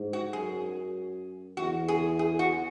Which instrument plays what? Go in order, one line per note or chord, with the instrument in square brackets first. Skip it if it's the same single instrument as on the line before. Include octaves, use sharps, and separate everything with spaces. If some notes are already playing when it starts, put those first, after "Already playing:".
Already playing: [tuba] G#2
[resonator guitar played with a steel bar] F#4
[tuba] F#2 [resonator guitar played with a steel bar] G#4
[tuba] E2 [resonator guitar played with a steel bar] F#4
[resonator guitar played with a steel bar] G#4
G#4
F#4